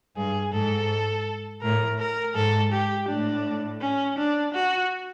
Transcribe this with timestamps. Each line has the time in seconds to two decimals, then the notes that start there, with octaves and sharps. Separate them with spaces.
0.17 G2 G#4
0.53 G#2 A4
1.62 A2 A#4
2.00 A#4
2.35 G#2 A4
2.72 G4
3.08 A2 D4
3.81 C#4
4.18 D4
4.54 F#4